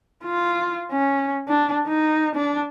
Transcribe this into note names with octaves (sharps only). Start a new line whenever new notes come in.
F4
C#4
D4
D#4
D4